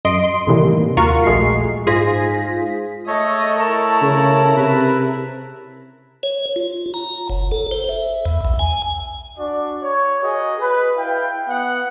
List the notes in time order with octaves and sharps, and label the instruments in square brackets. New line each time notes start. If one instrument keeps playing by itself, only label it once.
[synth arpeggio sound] F#2 D#5 C6 D7
C6
A2 C3 D#3 E3 G3 A#3
D#2 F4 F#4 A#4 C#6
A#1 G#3 A3 C7
G#2 F4 G#4 C5 A#6 B6
[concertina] A3 A4 C#5 [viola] D#5
[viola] E4 A#4 [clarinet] A5
[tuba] C#3
[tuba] C3 [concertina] B4 E5
[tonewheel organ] C#5
F4
A#5
F#1
A4
C5
E5
E2
B1
G#5
[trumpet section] D4 F#4 D5
C#5
F#4 G#4 A#4 D#5
B4
E4 F5 G5
B3 F#5